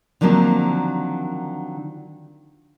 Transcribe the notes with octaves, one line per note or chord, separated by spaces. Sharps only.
D3 D#3 F3 F#3 A#3 C4